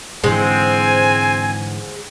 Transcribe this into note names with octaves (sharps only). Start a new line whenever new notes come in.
G#2 D3 E3 G#3 C4 C5 F#5 G#5